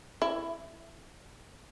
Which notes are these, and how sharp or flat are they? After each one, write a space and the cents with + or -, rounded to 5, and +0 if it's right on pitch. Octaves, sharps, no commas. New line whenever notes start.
E4 +5